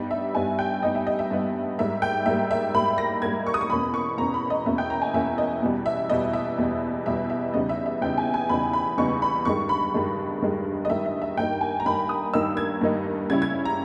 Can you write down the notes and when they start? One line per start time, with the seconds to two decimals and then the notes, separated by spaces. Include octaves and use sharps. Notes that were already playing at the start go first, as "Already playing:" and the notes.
Already playing: G2 G3 B3 D#4
0.11 E5
0.34 G2 G3 B3 D#4 G#5
0.59 G5
0.82 G2 G3 B3 D#4 D#5
0.95 E5
1.07 D#5
1.19 E5
1.31 G2 G3 B3 D#4
1.78 G#2 G3 A#3 E5
2.02 G5
2.26 G#2 G3 A#3 E5
2.51 E5
2.74 G#2 G3 A#3 B5
2.98 A#6
3.22 G#2 G3 A#3 G#6
3.47 C#6
3.54 D#6
3.61 C#6
3.70 E2 B2 A#3 C#4 B5
3.94 C#6
4.18 E2 B2 A#3 C#4 A#5
4.34 B5
4.50 D#5
4.66 E2 B2 A#3 C#4 E5
4.78 G5
4.90 A#5
5.02 G#5
5.14 E2 B2 A#3 C#4 E5
5.38 D#5
5.62 E2 B2 G3
5.86 E5
6.10 E2 B2 G3 D#5
6.33 E5
6.58 E2 B2 G3
7.06 E2 B2 G3 E5
7.30 E5
7.54 E2 C#3 G3 B3 D#4 D#5
7.69 E5
7.86 E5
8.02 E2 C#3 G3 B3 D#4 G5
8.18 G#5
8.34 G#5
8.49 E2 C#3 G3 B3 D#4 B5
8.73 B5
8.98 E2 C#3 G3 B3 D#4 C#6
9.22 B5
9.45 G2 D#3 G#3 C#6
9.69 B5
9.94 G2 D#3 G#3
10.42 G2 D#3 G#3
10.85 D#5
10.89 G2 D#3 G#3 E5
11.06 E5
11.22 E5
11.37 G2 D#3 A#3 D#4 G5
11.61 G#5
11.80 A#5
11.86 G2 D#3 A#3 D#4 B5
12.09 D#6
12.34 G2 D#3 A#3 D#4 E6
12.57 G#6
12.81 G2 D#3 A#3 D#4
13.30 C#3 G3 C#4 E4 G#6
13.42 G#6
13.65 A#5